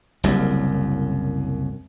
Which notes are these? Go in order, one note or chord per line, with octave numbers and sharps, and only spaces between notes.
F#1 C2 F#2